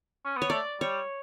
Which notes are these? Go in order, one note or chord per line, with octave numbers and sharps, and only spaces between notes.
C#4
B3 C#5
A3 D5
G3 C#5